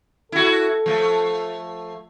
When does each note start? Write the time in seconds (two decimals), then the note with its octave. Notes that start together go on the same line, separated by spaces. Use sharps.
0.32 E4 F#4 A4
0.86 F3 A3